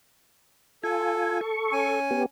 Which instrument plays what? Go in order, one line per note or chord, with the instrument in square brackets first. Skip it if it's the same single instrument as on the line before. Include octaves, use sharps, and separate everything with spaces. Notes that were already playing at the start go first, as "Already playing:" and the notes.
[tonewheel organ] F4 G#5 [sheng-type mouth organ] A4
[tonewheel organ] A4 C#6
[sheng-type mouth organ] C#4 G#5
[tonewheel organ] B3 G4